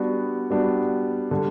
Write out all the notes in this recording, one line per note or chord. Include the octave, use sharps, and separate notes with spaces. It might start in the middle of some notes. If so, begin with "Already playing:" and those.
Already playing: G3 B3 D4 F#4
G3 B3 D4 F#4
D3 G3